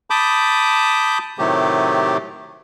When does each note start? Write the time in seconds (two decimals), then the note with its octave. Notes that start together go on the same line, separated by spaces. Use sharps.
0.10 A5 B5 D6 D#6 G6
1.39 A2 C3 D#3 F#3 A3 G4